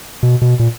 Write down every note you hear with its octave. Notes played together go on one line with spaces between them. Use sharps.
B2
B2
A#2